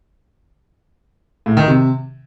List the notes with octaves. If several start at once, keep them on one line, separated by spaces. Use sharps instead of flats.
A2
D#3
C3